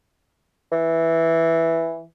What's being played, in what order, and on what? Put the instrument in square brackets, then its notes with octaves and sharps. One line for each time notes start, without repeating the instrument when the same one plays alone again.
[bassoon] E3